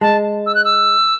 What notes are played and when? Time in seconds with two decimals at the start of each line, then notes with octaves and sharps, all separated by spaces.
0.01 G#3 A5
0.46 E6
0.55 F#6
0.65 E6